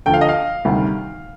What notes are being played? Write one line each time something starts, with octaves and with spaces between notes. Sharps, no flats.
D2 D3 F3 G5
F5
D#5
F5
D2 C3 D#3 G3